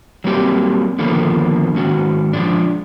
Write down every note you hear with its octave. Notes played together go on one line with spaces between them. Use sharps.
F#3 G3 A#3 C4 E4 G4
D3 D#3 F3 A#3 B3 A4
G#2 D#3 C#4 F#4
F3 G#3 D4